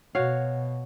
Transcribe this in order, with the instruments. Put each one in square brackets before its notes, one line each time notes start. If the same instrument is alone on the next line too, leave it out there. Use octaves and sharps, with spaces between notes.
[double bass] B2 [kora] F#4 C#5 F5